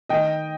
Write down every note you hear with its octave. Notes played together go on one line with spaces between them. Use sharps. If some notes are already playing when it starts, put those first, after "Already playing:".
D#3 D#5 G5